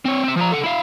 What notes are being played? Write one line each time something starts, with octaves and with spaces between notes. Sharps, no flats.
C4 C#5
C4 E5
F3 A#5
A4 F#5
E4 F5